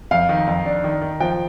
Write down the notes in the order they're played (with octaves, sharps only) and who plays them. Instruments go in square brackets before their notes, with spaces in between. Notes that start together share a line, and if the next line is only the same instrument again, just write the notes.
[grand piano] F2 F5
D#3
F2
D4
D#3
D#3
F3 G5